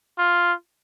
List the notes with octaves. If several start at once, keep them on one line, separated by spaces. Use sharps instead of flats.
F4